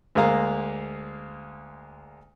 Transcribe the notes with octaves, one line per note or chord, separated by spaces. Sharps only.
D2 G#3 A#3 F5 A#5